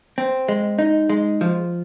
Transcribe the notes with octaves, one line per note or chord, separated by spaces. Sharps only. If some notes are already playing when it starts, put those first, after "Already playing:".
C4
G#3
D#4
G#3
F3